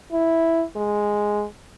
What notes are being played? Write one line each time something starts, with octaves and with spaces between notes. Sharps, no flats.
E4
G#3